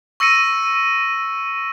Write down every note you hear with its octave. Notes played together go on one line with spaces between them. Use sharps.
C#6 E6 A#6 C#7 D#7